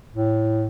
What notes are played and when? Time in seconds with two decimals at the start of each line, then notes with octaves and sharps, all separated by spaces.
0.13 A2